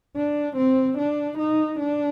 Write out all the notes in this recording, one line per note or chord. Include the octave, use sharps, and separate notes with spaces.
D4
C4
D4
D#4
D4